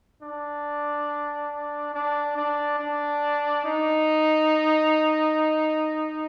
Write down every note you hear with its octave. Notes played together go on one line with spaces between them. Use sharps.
D4
D4
D4
D4
D#4